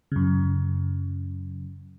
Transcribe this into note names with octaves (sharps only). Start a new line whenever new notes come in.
F#2 C#3